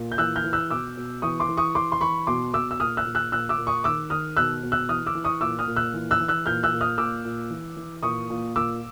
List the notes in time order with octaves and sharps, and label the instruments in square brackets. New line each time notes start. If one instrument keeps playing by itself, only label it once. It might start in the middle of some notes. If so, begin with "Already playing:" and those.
Already playing: [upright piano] A#2
G6
E3 E6 F#6
F6 G6
E3
E6 F#6
B2 D6 E6
B2
E3 C#6 D#6
C6 D6
E3
C#6 D#6
E3 C6 D6
C6
E3 B5 C#6
B2 C6 D6
B2 D6 E6
E6
A#2 D#6 F6
E6 F#6
A#2
E6 F#6
A#2 E6 F#6
D6 E6
A#2
C#6 D#6
D#3 D6 E6
D#3 D#6 F6
B2 E6 F#6
B2
E6 F#6
E3 D#6 F6
D6 E6
E3
C#6 D#6
A#2 D6 E6
D#6 F6
A#2
E6 F#6
E3
E6 F#6
E3
E6 F#6
A#2 F6 G6
E6 F#6
A#2
D#6 F6
A#2 D6 E6
A#2
E3
E3
A#2 C#6 D#6
A#2
A#2 D6 E6